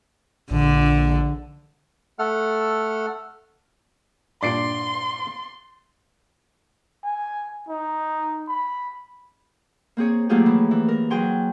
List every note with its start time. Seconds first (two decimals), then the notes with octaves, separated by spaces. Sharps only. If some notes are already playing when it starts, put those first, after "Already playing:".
0.51 A#1 D3
2.19 A3 A4 F#5 F6
4.43 G2 A#2 D4 D5 C6 C7 D7
7.04 G#5
7.69 D#4
8.48 B5
9.97 A#3 C4 G#4 C#5
10.29 F#3 A3 A#3 F4 G4 G#4
10.46 E3 F3 E4
10.71 E3
10.88 A#4
11.10 F#3 G#4 G5 G#5 C6